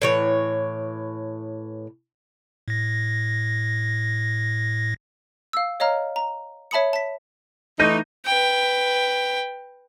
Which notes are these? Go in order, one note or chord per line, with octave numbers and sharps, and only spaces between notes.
A2 E3 C#5
A2 A#6
F5 E6
C#5 D#5 F5 A#5 F6
A#5
C#5 E5 A5 B5 D#6 C#7
A5 B6
E3 A3 D#4 G6 A#6 D#7
B4 G5